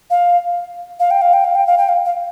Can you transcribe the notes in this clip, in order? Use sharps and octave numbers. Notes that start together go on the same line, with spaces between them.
F5
F5
G5
F5
G5
F5
G5
F5
G5
F5
F5